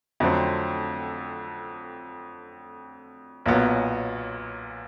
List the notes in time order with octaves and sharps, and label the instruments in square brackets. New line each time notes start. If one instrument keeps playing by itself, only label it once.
[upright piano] F2 D3 F#3 A3 C4
B1 A#2 F#3 B3